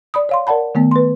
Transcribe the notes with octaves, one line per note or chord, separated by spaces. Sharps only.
D5 B5 D#6
C#5 F5 C6
A#4 D5 F#5 A5 B5
D#3 A3 B3
B4 C6